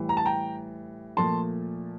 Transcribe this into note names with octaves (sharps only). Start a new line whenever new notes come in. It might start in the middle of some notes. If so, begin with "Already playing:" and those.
Already playing: A2 E3 G3
A#5
A5
G5 A#5
A#2 F3 A3 A5 C6